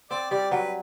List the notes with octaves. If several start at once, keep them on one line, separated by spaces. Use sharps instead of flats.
C4 D5
G3 D5
F#3 B4